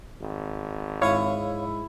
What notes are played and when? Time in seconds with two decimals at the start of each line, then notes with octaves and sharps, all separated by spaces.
0.22 G#1
1.02 G#2 E4 C#5 F5 C#6 D#6